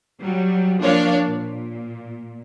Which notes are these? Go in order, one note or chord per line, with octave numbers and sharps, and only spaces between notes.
F#3 G3
F3 A#3 D4 C#5 F5
A#2